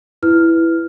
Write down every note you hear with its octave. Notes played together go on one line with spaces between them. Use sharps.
E4 B4 F6